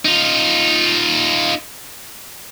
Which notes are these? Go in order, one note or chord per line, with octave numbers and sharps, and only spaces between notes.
D#4 F4